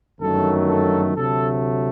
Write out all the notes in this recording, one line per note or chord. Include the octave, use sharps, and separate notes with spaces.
G1 F#2 D#3 F#3 A3 A4
A4
D2 C3 F#3 A3 A4